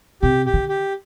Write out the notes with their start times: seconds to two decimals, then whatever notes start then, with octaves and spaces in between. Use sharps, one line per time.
0.22 C3 G4
0.46 G4
0.53 D3
0.69 G4